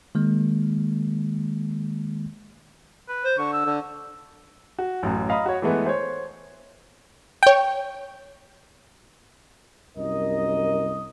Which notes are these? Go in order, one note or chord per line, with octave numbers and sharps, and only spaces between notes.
D#3 G#3 A#3
B4
C5
D3 C#6
E6
D3
F#4
A1 F#2
D#5 F5 A#5 B5 D#6
F#4 C#5
E3 G#3 A3 B3
C5 C#5
C#5 G5
C2 F#2 A#4 D#5